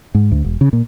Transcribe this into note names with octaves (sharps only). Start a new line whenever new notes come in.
G#2
D2
E1
C#3
A#2